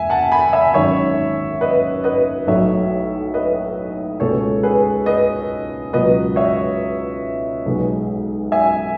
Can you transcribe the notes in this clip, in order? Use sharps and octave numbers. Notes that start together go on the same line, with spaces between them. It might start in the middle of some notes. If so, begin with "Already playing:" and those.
Already playing: E1 E5 G#5
F#5 A5
G#5 B5
E5 G#5
G#1 F#2 D#3 C#5 E5
B4 D#5
B4 D#5
B1 A2 F#3 B3 C#5 E5
B4 D#5
C#2 B2 G#3 B3 A4 C#5
G#4 B4
B4 D#5
C#2 B2 F#3 B3 B4 D#5
C#5 E5
B1 B2 G#3 B3
E5 G#5